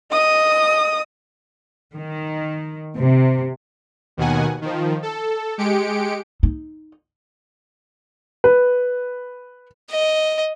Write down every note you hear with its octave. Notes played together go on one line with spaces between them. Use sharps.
D#5 D#6
D#3
C3
D#2 B2 D#3 F#5 G#5
D#3 F3
A4
G#3 G4 C#7 D7
D#4
B4
D#5